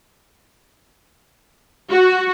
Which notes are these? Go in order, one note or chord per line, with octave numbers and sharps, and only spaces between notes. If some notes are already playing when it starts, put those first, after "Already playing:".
F#4